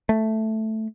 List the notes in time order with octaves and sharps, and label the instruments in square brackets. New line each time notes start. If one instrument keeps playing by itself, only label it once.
[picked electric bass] A3